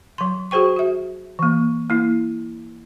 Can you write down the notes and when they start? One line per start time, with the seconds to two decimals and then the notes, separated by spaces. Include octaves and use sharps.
0.18 F#3 C6
0.51 F#4 G#4 C5 G5 C#6
0.76 F#4 E5
1.39 E3 A#3
1.90 A#3 E4